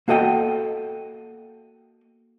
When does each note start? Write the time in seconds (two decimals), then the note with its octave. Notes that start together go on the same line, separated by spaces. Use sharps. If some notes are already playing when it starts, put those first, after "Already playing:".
0.08 A#3 F#4 A4 D#5 G5